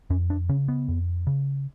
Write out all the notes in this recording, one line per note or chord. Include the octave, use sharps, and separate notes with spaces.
F2 C#4
D4
C#3 C#4
B3
F2
C#3